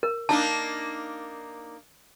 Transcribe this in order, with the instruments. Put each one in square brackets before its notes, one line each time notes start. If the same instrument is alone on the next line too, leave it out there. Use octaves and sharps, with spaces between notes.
[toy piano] A#4
[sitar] A#3 D4 D#4 [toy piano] A5